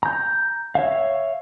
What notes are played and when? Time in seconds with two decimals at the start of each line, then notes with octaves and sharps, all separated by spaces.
0.03 A#5 G6
0.75 C#5 E5 F5